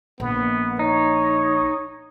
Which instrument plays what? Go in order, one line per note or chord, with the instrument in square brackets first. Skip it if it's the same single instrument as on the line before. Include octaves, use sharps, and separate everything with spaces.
[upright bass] A#1 [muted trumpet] B3
[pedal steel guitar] D#4 [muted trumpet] C#5